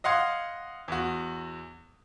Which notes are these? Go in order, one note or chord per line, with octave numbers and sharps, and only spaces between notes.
D#5 F5 F#5 C6 G#6
E2 F#4